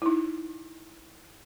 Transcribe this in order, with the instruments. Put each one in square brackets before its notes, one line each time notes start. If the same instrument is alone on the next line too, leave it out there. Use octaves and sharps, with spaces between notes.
[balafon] D#4 E4